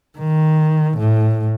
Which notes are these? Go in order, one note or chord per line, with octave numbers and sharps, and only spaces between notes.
D#3
A2